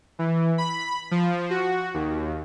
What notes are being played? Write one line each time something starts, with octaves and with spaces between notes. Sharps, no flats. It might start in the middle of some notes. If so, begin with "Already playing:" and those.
E3
B5
F3
F#4
D#2